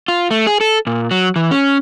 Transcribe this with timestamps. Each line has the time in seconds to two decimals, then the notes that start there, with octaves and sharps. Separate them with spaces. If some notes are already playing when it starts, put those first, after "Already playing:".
0.08 F4
0.31 A3
0.47 G#4
0.61 A4
0.87 A#2
1.11 F#3
1.36 E3
1.51 C#4